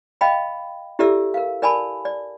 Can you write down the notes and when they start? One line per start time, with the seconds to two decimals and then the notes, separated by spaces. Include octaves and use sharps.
0.21 D#5 F5 G5 B5
0.99 E4 G4 A4 D5 E5 E6
1.34 A#4 F5
1.62 A#4 D5 G#5 A5 B5
2.05 D5